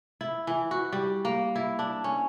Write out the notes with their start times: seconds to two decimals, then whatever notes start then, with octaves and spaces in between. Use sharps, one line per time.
0.21 E4
0.47 E3
0.71 F#4
0.93 G3
1.25 A#3
1.56 E4
1.79 D4
2.04 C#4